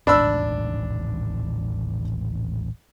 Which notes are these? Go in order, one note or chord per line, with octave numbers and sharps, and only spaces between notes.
D#1 A1 G#2 D4 B5 E6